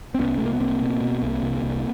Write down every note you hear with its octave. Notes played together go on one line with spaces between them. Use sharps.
C4
C2 B3 C#4
C2 A3
A#3
B3
C2 A#3 C4
B2
B2
C2
C2
C2